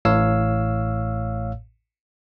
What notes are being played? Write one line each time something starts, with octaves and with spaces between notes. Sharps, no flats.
A1 A2 C#5 F5 E6